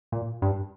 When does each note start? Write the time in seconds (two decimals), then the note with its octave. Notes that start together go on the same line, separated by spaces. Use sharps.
0.12 A#2
0.42 G2